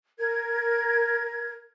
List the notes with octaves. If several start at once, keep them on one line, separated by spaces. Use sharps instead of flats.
A#4 G#6